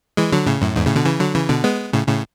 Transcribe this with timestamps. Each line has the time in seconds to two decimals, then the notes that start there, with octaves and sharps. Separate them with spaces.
0.17 E3 G#3
0.33 D3 F#3
0.47 A2 C#3
0.62 F#2 A2
0.76 E2 G#2
0.86 A2 C#3
0.96 B2 D3
1.05 C#3 E3
1.20 D3 F#3
1.35 C#3 E3
1.49 B2 D3
1.64 G#3 B3
1.93 A2 C#3
2.07 A2 C#3